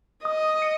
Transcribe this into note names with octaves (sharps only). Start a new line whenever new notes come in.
D#5 D#6
C#7